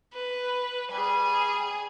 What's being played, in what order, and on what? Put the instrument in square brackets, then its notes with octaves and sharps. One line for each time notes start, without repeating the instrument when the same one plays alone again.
[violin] B4
[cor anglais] G3 [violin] G#4 G#5